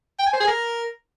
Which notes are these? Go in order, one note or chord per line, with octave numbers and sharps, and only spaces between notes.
G5
G#5
C5
G#4
A#4